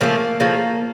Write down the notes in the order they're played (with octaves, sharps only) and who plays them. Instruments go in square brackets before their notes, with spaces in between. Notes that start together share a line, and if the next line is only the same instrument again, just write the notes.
[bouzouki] C#3 F3 A3 A#3
C#3 F3 A3 A#3